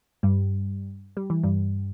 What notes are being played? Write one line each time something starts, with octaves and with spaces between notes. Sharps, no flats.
G2 G3
G3
E3
G2 G3